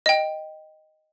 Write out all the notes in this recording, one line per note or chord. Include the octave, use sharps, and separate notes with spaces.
D#5 G5